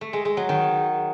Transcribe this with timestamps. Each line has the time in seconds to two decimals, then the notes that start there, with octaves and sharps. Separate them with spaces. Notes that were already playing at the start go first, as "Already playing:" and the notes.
0.01 A3
0.13 G#3
0.25 G#3
0.37 F#3
0.49 D#3